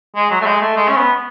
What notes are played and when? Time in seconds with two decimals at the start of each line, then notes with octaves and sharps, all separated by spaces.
0.16 G#3
0.31 F#3
0.41 A3
0.46 G#3
0.61 A3
0.77 G#3
0.88 C#4
0.97 B3